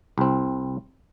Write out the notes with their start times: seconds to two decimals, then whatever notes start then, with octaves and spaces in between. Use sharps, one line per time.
0.18 C2 C4